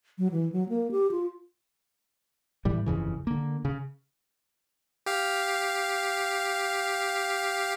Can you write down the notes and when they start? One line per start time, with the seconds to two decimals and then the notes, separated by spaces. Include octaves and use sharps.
0.18 F#3
0.32 E3
0.52 F#3
0.69 A#3
0.91 G4
1.11 F4
2.65 A2 E3 G3
2.86 G1 F2 C#3 E3
3.27 D3 A#3
3.65 C#3
5.06 G4 F5